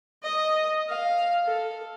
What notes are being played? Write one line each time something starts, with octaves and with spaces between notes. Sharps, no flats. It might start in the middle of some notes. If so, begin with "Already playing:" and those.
D#5
F5
A4